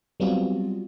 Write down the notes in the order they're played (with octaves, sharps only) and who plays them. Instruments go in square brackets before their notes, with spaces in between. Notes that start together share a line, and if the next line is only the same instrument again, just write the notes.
[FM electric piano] F#3 G3 B3 C4 F4 F#4